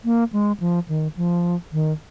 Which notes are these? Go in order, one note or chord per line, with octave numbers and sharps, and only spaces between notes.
A#3
G#3
F3
D#3
F3
D#3